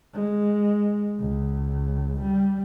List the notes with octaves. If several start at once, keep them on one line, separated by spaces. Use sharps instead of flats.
G#3
C#2
G3